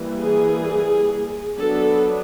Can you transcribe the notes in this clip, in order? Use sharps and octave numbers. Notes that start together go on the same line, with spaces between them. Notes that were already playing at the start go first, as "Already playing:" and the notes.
Already playing: E3 G3 A#3
G#4
F#3 B3 D4 A4